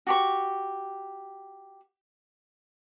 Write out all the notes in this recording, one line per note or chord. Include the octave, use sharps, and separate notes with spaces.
F#4 G4 C#6